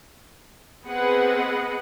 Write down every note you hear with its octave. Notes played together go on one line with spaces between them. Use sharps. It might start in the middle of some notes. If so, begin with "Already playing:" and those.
B3 C4 G#4 B4 D#5 F#5